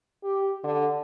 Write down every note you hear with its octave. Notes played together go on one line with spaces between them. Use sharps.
G4
D3